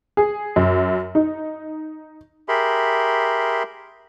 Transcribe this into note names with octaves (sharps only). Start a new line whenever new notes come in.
G#4
F#2
D#4
G4 G#4 A#4 E5 B5 C6